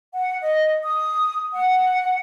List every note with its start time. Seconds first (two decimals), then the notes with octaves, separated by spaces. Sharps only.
0.14 F#5
0.42 D#5
0.83 D#6
1.55 F#5